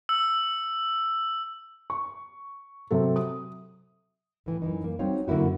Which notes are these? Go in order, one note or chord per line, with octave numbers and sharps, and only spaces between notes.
E6
C#6
C3 F#3 A4
D#6
A2 E3
F#2 E3 D#4
A#3
G3 C4 D#4 F#4 C#5 F5
F#2 D3 A#3 E4 F#4